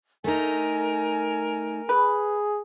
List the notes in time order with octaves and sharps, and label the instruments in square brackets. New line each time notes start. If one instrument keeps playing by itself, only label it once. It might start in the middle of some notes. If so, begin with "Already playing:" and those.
[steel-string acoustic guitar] A3 D#4 [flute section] A#4 G#5
[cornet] G#4 [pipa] B4